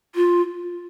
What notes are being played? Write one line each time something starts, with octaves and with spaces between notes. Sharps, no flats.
F4